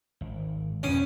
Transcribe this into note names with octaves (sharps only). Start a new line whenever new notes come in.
G#1
F2 B2 C#4